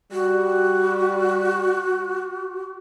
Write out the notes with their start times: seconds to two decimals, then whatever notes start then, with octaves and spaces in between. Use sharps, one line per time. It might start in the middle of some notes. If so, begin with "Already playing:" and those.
0.12 G3 F#4